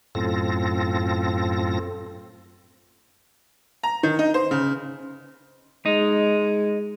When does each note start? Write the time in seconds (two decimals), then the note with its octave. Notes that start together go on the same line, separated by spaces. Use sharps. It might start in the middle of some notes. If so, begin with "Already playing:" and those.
0.15 F#2 A2 C4 F4 A4 A#6
3.83 A#5
4.03 D#3
4.19 D#4
4.34 C5
4.51 C#3
5.86 G#3 D#4